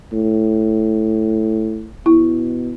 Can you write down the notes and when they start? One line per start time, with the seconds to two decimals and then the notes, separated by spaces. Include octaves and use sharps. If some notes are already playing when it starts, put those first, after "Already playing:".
0.13 A2
2.06 B2 E4